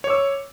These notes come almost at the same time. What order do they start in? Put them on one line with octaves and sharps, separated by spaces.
C#5 D6 E6